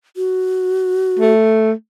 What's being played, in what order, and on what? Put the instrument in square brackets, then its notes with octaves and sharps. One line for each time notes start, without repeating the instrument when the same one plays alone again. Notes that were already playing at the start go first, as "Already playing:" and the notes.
[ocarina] F#4
[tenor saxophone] A3